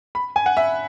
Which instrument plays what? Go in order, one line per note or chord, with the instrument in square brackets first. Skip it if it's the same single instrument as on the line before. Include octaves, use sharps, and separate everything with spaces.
[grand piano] B5
G#5
F#5
E5